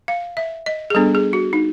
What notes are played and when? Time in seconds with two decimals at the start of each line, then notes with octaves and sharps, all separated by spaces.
0.08 F5
0.37 E5
0.66 D#5
0.90 G#4
0.95 G3 B3 D4 A4
1.15 G#4
1.33 F#4
1.53 D#4